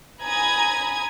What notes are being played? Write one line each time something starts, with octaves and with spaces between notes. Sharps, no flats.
G#5 A#5 B5 D#6 G#6